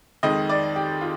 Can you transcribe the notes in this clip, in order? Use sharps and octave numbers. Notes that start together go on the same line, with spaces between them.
F2 D#3 G#3 D#5
D5
G4
F4